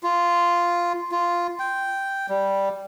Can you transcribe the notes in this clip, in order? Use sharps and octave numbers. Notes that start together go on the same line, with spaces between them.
F4
F4
G5
G3